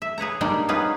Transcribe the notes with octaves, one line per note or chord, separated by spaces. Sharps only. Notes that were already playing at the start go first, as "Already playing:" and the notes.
E5
G#4 B4 C#5 A#5
G3 G#3 A#3 D4 D#4 D5
B3 C#4 D#4 F4 G#4 B4